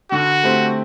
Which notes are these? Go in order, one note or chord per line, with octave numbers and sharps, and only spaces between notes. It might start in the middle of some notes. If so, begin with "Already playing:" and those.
D3 F#4
A3 C4 G4 C5